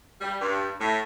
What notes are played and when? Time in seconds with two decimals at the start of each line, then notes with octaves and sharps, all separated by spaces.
0.21 G3
0.41 G2
0.79 A2